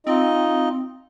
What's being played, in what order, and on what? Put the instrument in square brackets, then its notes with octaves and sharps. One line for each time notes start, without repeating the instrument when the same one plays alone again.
[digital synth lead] C4 [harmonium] D#4 F4 D#5